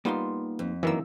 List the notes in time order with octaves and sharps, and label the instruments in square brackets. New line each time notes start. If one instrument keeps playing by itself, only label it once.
[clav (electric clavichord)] G3 B3 F4 [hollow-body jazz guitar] A#3 D#4 C6
[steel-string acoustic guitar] F2
[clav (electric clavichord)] F#2 D#3 A#3 [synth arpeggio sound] E3 E6